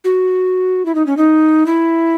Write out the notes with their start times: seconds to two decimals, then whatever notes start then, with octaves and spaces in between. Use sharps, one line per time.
0.04 F#4
0.86 E4
0.95 D#4
1.06 C#4
1.17 D#4
1.66 E4